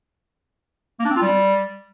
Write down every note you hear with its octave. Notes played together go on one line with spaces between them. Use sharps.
A#3
D4
C4
F4
G3